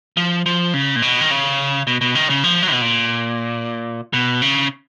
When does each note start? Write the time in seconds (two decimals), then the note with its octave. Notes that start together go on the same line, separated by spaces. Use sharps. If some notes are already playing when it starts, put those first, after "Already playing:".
0.17 F3
0.46 F3
0.74 C#3
0.96 A#2
1.02 B2
1.21 D#3
1.31 C#3
1.87 B2
2.01 B2
2.15 D#3
2.30 C#3
2.44 F3
2.63 F#3
2.72 B2
2.81 A#2
4.13 B2
4.42 C#3